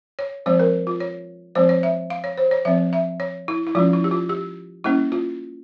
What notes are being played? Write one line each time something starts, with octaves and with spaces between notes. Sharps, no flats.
C#5
F3 G#3 C4 C5
A#4
F4
C#5
F3 G#3 C4 C5
C#5
E5
F5
C#5
C5
C#5
F3 C4 E5
E5
C#5
E4
E4
F3 G#3 C#4 F4
E4
G4
F4
G4
G3 A#3 C#4 E4
F4